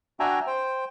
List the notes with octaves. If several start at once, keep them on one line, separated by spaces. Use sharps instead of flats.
D4 F#4 E5 G5 G#5 A#5
C5 G5